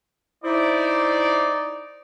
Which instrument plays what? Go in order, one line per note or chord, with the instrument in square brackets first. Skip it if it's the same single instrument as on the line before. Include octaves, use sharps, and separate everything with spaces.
[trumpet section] D#4 D5 [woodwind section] E4 C5